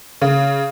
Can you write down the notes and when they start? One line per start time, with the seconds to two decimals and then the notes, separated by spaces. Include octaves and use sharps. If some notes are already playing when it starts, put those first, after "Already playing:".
0.22 C#3